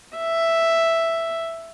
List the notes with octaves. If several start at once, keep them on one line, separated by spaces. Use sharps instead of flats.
E5